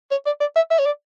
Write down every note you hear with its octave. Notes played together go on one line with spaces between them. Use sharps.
C#5
D5
D5
E5
E5
C#5
D5